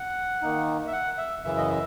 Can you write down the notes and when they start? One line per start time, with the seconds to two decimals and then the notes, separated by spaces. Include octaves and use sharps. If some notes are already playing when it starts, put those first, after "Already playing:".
Already playing: F#5
0.42 D#3 A#3 D#4
0.87 E5
0.93 F#5
1.18 E5
1.44 F#2 C#3 E3 E5
1.58 D#5
1.69 E5